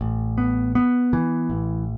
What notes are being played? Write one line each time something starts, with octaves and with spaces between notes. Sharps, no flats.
A1
B3
B3
E3
A1